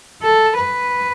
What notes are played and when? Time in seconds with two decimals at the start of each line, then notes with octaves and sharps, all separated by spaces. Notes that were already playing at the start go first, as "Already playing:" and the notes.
0.22 A4
0.57 B4